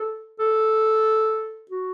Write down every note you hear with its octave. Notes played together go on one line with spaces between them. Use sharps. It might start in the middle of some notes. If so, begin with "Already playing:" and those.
Already playing: A4
A4
F#4